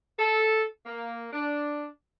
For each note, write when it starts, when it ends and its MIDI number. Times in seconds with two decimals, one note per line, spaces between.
0.19 0.63 69
0.85 1.28 58
1.33 1.85 62